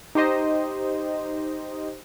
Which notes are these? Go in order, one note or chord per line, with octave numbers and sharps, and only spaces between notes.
D#4 G4 C5 D#5